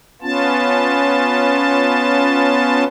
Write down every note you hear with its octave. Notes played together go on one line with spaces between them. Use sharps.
B3 C#4 F4 A5